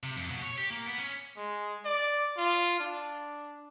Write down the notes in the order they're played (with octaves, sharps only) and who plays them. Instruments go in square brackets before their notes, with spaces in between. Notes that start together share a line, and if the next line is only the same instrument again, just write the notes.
[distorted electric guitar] C3
F2
B2
C#5
G4
A#3
B3
C#4
[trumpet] G#3
D5
F4
D4